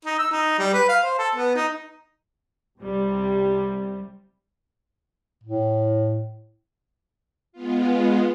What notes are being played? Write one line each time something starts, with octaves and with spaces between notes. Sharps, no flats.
D#4
E6
D#4
G3
B4
F5
C5
A4
B3
D#4
C2 C3 G3
A2
G#3 B3 F4